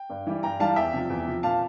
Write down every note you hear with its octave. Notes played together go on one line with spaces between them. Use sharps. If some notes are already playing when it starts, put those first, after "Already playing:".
Already playing: G5
G2
E3 G3
G2 G5 A#5
E3 G3 F5 A5
E2 E5 G5
C3 F3
E2
C3 F3
A#2 F5 A5